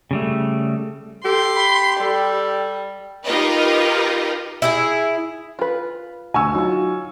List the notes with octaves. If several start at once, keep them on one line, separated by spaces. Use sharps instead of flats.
C#3 G3 A3
G4 A4 C6
B5
G3 A4
D#4 F4 G4 A#4 B4 D#5
E4 G4 G#4
F4 B4
D2 G#5 C#6 E6
F#3 D#4 F4